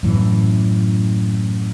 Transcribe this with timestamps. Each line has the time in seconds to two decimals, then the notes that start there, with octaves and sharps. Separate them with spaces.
0.03 F#2 A2 E3